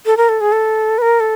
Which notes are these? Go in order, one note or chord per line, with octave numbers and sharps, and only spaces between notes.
A4
A#4
A4
G#4
A4
B4
A#4
A4